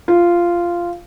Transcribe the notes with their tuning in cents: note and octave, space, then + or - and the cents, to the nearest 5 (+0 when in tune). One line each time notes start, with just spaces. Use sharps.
F4 -10